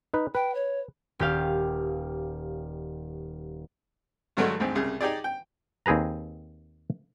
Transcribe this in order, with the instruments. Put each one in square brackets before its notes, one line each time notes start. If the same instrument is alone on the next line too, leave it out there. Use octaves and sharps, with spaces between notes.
[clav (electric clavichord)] D#4 B4
[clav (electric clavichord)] B4 [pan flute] G5
[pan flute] C#5
[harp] D#1 G4 F5
[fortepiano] G2 D3 F#3 G#3 A3
D2 G#2 C4
C2 C#3 G#4
D#4 G4 G#4 D5
G5
[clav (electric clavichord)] D#2 C4 G#4 B4 A#5